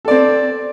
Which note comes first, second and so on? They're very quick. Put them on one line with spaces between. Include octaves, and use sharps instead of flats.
A4 D5 C4